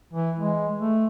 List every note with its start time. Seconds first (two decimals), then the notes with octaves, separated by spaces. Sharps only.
0.13 E3
0.40 G#3
0.80 A3